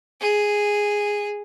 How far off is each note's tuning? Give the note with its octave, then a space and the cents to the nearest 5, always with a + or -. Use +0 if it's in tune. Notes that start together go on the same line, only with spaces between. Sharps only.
G#4 -5